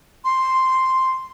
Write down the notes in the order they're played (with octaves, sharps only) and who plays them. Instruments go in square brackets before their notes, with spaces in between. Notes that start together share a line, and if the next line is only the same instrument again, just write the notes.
[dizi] C6